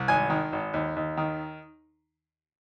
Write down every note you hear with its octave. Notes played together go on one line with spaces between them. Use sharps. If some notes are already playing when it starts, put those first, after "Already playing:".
Already playing: C2
G#1 G#5
D#3
G#1
D#2
D#2
D#3